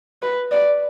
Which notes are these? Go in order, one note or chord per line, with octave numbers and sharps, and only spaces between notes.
B4
D5